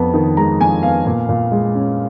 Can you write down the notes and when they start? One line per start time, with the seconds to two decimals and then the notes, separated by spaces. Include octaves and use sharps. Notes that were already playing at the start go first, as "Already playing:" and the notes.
Already playing: F2 B3
0.14 D#3
0.37 G#3 A#5
0.61 F2 G#5
0.83 B3 F5
1.06 A#2
1.29 A#2
1.52 G#3
1.75 C#4